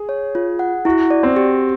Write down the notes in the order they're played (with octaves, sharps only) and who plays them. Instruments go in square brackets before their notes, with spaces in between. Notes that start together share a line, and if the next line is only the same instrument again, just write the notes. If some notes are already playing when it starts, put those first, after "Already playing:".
Already playing: [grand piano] G#4
[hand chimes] C#5
F4
F#5
[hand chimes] E4 [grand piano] F#4
[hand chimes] D5
[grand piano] C4
[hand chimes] G4